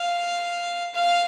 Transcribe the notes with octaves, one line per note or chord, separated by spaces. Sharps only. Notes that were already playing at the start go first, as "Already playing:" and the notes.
Already playing: F5
F5